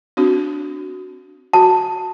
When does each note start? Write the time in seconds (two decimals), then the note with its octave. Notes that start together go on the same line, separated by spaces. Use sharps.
0.17 C4 D4 F#4
1.53 F#4 A5